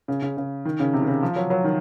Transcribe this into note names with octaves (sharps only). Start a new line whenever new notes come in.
C#3
C#3
C#3
D#3
C#3
C3
D#3
C#3
F3
F#3
F#3
D#3